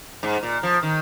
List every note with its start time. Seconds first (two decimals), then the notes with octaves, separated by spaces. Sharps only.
0.23 G#2
0.43 A#2
0.63 F3
0.83 D#3